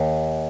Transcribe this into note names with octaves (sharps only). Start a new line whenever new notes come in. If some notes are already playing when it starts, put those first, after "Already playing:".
Already playing: D#2